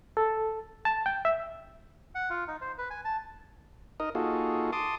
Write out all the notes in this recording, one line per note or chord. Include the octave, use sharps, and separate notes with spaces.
A4
A5
G5
E5
F#5
F4
D#4
C5
B4
G#5
A5
D#4 A#4 D#5
A#3 D#4 F4 F#4 G#4 A4
A5 C6 D6 D#6